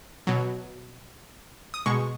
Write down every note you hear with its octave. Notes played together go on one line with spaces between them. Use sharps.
B2 F#3
D#6
B2 G#3 C#6